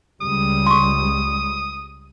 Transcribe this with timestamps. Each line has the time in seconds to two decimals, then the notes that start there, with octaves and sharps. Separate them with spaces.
0.21 C#2 G3 D#6
0.66 C6 C#6